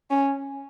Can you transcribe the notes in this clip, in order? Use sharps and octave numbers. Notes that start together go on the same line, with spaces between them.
C#4